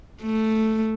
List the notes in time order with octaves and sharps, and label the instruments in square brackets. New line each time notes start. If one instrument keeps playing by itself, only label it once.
[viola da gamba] A3